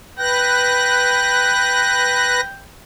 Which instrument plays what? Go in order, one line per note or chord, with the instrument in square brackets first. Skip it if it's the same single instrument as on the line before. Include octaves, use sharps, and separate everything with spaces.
[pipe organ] B4 F#6 A#6 [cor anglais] G5